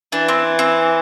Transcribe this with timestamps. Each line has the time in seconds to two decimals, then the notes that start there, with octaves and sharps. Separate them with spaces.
0.12 E3 D4
0.28 C4
0.59 C4